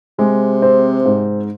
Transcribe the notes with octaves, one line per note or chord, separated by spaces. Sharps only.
C3 G#3
C4
G#2